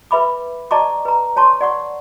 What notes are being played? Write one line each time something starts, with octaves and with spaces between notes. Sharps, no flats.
B4 E5 B5 D6
D5 D#5 A5 A#5 C#6 D6
B4 A#5
C#5 A5 C6 C#6
D5 F#5 C#6